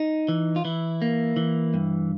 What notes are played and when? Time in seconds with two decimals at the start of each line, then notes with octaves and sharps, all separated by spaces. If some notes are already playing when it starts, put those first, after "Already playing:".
Already playing: D#4
0.29 E3
0.56 F4
0.65 E3 E4
1.02 A#3
1.37 E3
1.74 G2